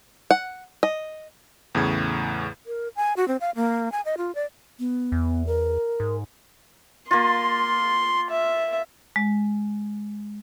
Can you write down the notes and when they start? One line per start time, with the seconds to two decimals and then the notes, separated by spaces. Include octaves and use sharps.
0.31 F#5
0.83 D#5
1.75 E2 A2 C#3 G#6
2.66 A#4
2.96 G#5
3.17 F#4
3.28 C4
3.41 F5
3.56 A#3
3.92 G#5
4.05 D#5
4.18 F4
4.35 D5
4.79 B3
5.12 E2
5.47 A#4
6.00 G#2
7.11 A#3 F4 C6
8.30 E5
9.16 G#3